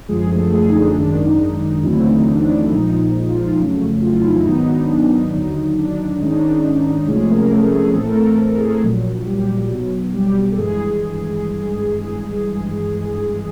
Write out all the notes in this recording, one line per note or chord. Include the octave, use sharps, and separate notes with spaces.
F#2 D3 F3 G#3 G#4
A3 A4
G#3 G#4
D#4
D4
G#1 F#2 D#3 G#3 D4
D#4
D#4
D#2 D3 E3 F#3 A3 C4 E4
D#4
D4
D4
E4
A#1 A#2 F3 G#3 D#4
F3 F4
F2 C#3 F#3 A3
F4
E4
D#4
E3 E4
G#2 D#3 F#3 B3 D#4
D#4
D4
D#4
D#2 D3 F#3 D#4
D4
G#2 D#3 G#3 C#4 D#4
D4
D#4
D#4
D#4
C2 C3 F3 G#3 A3 C#4 G#4
A#3 A#4
G#4
A3 A4
G#3 G#4
A2 E3 A3 C4 A4
A#4
A3 A4
A#4
A4
G#4
A3 A4
A#1 A#2 F#3
G3 G4
B1 B2 F#3
G3 G4
A4
G#1 G2 E3 G#3 G#4